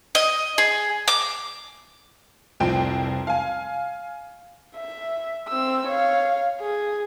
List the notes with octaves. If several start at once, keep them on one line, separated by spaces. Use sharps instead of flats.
D#5
G#4
D6
F1 C2 F3 C4 G5
F5 G#5
E5
C4 E6
C#5 F5
G#4